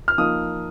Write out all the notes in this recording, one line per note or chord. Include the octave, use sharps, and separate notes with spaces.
F6
F3 A#3 D#4 D#6